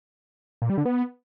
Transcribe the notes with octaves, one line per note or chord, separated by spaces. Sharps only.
A#2
G3
D3
B3